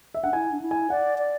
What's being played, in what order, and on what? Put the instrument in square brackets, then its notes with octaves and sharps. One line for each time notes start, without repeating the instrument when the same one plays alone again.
[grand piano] E5
[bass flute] D4 [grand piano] F#5
[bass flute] E4 [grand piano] G#5
[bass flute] D4
E4
[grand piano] G#5
[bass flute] D5 [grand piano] F#5
[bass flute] D5